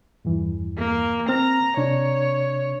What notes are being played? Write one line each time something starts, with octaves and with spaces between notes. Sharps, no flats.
E2 G2 E3
A#3
C4 A#5 F6
C3 D4 C#5